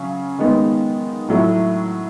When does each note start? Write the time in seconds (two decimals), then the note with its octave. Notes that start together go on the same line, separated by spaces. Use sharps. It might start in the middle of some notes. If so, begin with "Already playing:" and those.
Already playing: C#3 F#3 C#4
0.38 D#3 G#3 B3 D#4
1.28 A2 F#3 A3 E4